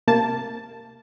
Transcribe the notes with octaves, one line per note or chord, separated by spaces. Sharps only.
C3 A#3 A5